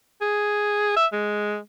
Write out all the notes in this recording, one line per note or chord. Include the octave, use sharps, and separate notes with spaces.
G#4
E5
G#3